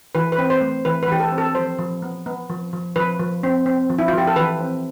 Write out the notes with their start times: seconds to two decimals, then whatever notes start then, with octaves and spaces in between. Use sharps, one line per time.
0.15 E3 B4
0.32 B4
0.38 C4
0.50 C5
0.61 A3
0.85 E3 B4
1.03 B4
1.08 E3 G4
1.20 A4
1.32 C4
1.38 A4
1.55 F3 C5
1.78 F3
2.02 B3
2.26 B3
2.50 F3
2.73 F3
2.96 F3 B4
3.19 F3
3.43 C4
3.66 C4
3.90 F3
3.99 E4
4.08 F4
4.13 F3 G4
4.27 A4
4.36 E3 B4
4.60 C4